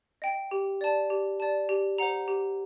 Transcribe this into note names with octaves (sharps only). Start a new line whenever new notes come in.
D#5 G5
G4
D5 A5
G4
D5 A5
G4
C5 F#5 A#5
G4